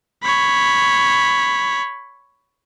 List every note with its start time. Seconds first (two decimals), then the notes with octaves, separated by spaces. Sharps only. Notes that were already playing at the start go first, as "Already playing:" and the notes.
0.24 C#5 B5